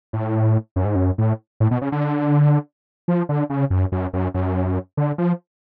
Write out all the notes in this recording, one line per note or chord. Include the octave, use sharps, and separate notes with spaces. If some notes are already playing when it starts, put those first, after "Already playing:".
A2
F#2
G#2
F#2
A2
A2
B2
C#3
D3
F3
D3
C#3
F#2
F#2
F#2
F#2
D3
F3